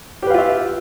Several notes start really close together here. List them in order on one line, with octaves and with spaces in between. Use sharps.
G4 B4 F5 F4 E5